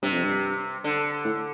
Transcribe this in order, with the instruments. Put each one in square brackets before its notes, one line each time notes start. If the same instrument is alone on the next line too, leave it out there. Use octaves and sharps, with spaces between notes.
[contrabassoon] G2 [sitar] C3
[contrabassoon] F2
G2
[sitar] D3
[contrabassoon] A2